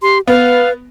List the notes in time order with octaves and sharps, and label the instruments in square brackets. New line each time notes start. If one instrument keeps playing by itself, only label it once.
[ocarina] G4 [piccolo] C6
[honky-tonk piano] B3 [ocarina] B4 [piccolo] F5